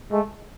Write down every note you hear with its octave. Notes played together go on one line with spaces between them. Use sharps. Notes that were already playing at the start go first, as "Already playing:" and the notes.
G#3 A3